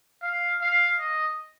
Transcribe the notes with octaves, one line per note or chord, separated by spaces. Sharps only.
F5
F5
D#5